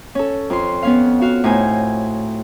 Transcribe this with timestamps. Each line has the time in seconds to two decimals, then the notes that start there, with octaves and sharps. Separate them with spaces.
0.15 C#4 A4
0.50 F2 C6
0.83 B3 C#4 F5
1.21 F#4 F5
1.44 A2 D#4 C5 G#5